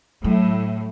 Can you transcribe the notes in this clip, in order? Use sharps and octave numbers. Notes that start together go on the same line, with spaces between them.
A2 F#3